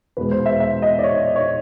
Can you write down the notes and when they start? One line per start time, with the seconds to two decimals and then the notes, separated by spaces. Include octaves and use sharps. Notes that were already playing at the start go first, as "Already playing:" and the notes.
0.17 E2 B2 G#3 B4
0.31 C5
0.46 E5
0.60 E5
0.82 D#5
0.99 D5
1.04 C#5
1.36 C#5